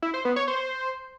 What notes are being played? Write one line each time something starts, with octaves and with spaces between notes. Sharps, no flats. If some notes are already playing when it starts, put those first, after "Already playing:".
E4
C5
B3
C#5
C5